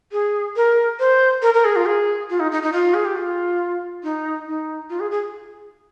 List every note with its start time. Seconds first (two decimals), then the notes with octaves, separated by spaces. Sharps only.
0.12 G#4
0.56 A#4
0.99 C5
1.42 A#4
1.54 A#4
1.65 G#4
1.76 F4
1.86 G#4
2.30 F4
2.40 D#4
2.52 D#4
2.62 D#4
2.72 F4
2.94 G#4
3.05 G4
3.16 F4
4.03 D#4
4.47 D#4
4.90 F4
5.00 G#4
5.11 G#4